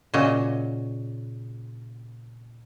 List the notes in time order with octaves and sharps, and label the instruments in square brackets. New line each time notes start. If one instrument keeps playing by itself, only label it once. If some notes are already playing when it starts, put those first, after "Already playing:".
[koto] A#2 C#3 F#4 D#5